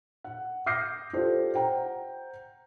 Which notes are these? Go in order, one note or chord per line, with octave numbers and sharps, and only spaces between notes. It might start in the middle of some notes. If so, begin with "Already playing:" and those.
F#5
D6 D#6 F6 G6 A#6 C7
F4 G4 A4 C5 D5
C5 F#5 G5 A#5